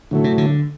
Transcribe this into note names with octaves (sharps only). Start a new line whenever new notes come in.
A2 D3 F#3 A3
C3
D3